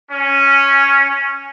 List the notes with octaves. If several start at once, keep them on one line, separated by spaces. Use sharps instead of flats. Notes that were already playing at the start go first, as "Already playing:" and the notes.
C#4